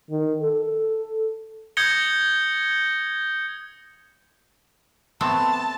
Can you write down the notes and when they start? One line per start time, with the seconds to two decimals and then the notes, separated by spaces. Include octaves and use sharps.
0.10 D#3
0.42 A4
1.77 D#6 G6 G#6 A#6 C#7 G7
5.21 A3 B3 C4 A5